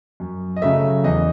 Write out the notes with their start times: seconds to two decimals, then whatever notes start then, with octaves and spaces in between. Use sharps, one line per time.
0.20 F#2
0.56 D#5
0.62 C#3 F#3 A3 E5
1.04 E2 D#5